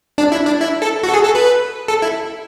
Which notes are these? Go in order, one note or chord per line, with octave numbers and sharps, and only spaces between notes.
D4
E4
D4
E4
A4
F#4
A4
G#4
A4
B4
A4
E4